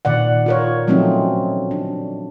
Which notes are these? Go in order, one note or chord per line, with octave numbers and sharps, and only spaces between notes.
A#2 D#3 D5 F#5
F4 A#4 C#5
F3 F#3 A3 C4 C#4 D#4
D4